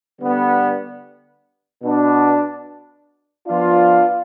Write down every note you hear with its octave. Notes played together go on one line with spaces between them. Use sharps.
D3 G3 B3
B2 B3 D4
F3 B3 D4 F4